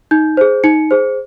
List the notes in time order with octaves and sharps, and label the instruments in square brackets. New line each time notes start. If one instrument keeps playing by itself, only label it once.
[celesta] D#4 G6
G#4 C5
D#4 C#7
G#4 C5